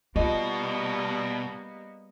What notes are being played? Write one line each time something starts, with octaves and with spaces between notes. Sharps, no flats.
B2 G3 A#3 B3 F4 D#5